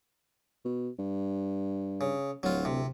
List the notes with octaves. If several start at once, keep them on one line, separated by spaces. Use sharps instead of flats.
B2
G2
C#3
D1 F#3 F4
C3